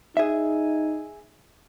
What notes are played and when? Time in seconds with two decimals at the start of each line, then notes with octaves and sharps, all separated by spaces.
0.17 D#4 G#4 E5